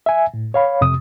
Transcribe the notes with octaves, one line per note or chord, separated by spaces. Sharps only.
E5 G#5
A2
C#5 F5 B5
F2 C3 D#6